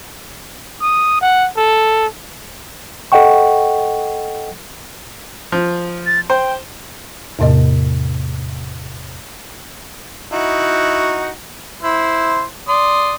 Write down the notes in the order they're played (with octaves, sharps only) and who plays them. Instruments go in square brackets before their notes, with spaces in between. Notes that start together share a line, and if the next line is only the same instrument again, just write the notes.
[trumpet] D#6
F#5
A4
[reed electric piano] A4 D#5 F#5 G5 C#6
[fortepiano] F3
[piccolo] A6
[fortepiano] C5 [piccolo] G5
[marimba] E2 A2 C3 A#3 D#5
[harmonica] D#4 E4 F#4
E4 C5
D5 C6 D#6